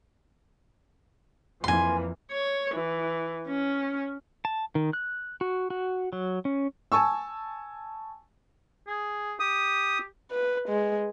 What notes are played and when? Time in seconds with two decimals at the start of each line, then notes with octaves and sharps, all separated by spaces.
1.64 F2 E3 A#3 G#5 C6
2.31 C#5
2.74 E3
3.47 C#4
4.45 A5
4.75 D#3
4.93 F#6
5.41 F#4
5.70 F#4
6.13 F#3
6.45 C#4
6.92 G#5 A5 C#6 E6
8.88 G#4
9.40 G4 D#6
10.31 B4
10.69 G#3